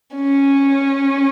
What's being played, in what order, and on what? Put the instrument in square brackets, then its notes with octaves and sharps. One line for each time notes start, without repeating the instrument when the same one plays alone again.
[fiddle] C#4